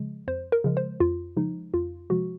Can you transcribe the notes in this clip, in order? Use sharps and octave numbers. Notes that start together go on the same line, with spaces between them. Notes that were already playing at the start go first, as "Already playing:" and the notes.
Already playing: C#3 F3 G#3
F2 C5
A#4
C#3 F3 G#3
C5
F2 F4
C#3 F3 G#3 D#4
F2 F4
C3 F3 G#3 F#4